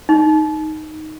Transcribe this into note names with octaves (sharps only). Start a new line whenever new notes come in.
D#4